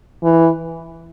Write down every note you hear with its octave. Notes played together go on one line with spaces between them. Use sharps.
E3